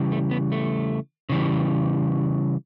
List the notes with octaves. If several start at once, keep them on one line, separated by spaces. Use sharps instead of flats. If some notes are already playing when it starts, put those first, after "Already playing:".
Already playing: C#3 E3 G3
A3
B3
A3
C#3 E3 G3